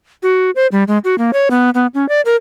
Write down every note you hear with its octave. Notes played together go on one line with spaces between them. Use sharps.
F#4
C5
G3
G#3
F#4
A#3
C#5
B3
B3
C#4
D5
A#4